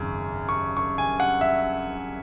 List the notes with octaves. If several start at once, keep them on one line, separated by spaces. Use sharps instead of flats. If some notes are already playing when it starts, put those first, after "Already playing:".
Already playing: G#1 F#2 C#3
C#6
C#6
G#5
F#5
E5